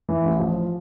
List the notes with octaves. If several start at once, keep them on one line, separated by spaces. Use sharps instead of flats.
E3
A1
F3